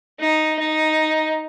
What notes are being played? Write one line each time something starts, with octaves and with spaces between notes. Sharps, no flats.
D#4
D#4